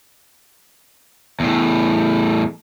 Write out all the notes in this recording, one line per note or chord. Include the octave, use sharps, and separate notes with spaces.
E2 A2